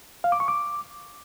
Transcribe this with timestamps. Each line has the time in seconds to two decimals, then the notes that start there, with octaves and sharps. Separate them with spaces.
0.24 F5
0.32 D6
0.40 C#6
0.48 D6